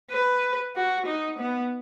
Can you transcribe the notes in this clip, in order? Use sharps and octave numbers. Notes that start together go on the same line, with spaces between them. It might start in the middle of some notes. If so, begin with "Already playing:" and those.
B4
F#4
D#4
B3